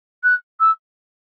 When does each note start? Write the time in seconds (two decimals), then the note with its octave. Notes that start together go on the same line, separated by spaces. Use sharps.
0.24 F#6
0.60 E6